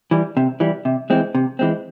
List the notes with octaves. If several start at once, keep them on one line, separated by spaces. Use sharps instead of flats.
E3 G3
C3
E3 G3
C3
E3 G#3 C4
C3
E3 G#3 C4